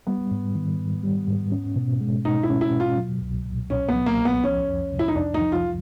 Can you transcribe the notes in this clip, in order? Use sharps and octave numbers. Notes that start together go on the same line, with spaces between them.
G3 B3
G#2
D#3
G#2
G3
G#2
C#4
B2
G#3
B2 D#4
E4
C#4
E4
B2
F4
F#3
C2
A#2
C2 C#4
B3
F#3
A#3
C2
B3
F3 C#4
F2
C3
E4
D#4
F2 D4
D#4
F3
F4